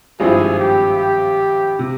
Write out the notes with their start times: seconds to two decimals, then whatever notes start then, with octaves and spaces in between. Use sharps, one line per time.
0.20 G#1 G2 F3 C4 E4 G#4
0.59 G4
0.98 G4
1.79 C3